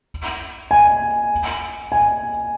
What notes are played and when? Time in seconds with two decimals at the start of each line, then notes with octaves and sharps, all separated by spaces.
0.71 G#5
1.92 G#5